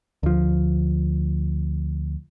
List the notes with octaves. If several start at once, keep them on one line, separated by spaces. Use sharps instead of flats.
D2 F3